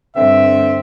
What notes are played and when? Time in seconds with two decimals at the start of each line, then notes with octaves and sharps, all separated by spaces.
0.16 G2 D3 C4 E5